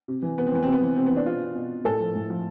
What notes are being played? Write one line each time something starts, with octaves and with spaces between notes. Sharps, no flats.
C3
E3
C3 B3
C4
E3 B3
C4
C3
B3
E3
C3 C4
B3
E3
D4
B2 F4
B2
A2 A4
F3
A2
F3